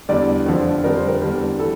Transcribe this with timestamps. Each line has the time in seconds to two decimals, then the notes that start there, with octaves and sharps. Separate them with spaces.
0.09 E2 D3 G3 D5
0.46 F2 D3 F3
0.84 F2 D3 G3 A#4
0.96 C5
1.08 A#4
1.22 E2 D3 G3
1.59 E3 G3 A4